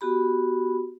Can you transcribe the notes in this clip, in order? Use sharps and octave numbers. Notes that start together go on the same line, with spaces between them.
B3 F#4 G4 B5